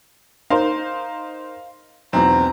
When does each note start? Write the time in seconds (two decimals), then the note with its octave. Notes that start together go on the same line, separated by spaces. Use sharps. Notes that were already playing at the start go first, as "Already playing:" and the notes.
0.50 D#4 A#4 C5 F5
2.13 B1 E2 C4 A#5